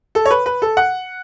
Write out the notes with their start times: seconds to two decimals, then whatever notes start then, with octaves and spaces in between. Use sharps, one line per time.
0.15 A4
0.26 C#5
0.31 B4
0.46 B4
0.62 A4
0.77 F#5